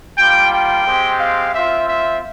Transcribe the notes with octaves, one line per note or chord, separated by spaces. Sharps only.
G3 A#3 F4 G5
G5
G#3 C4 G4
F5
C4 F4 E5
E5